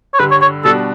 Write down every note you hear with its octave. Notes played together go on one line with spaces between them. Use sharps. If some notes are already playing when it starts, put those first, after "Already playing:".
C#5
G2 D3 G3 B4
C#5
C#5
B2 G3 D4 F#4 A4